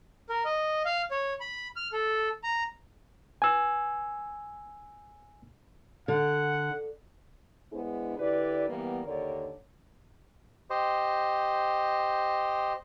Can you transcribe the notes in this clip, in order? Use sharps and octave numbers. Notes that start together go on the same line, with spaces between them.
A#4
D#5
F5
C#5
B5
F6
A4
A#5
G#5 E6
D3 F#5
G#3 B3 D4 E4 G#4 C5
D3 E4 G4 B4 D5
E3 G3 A#3 B3
D#2 D3 D4 A#4 C#5 D5
G4 C5 D#5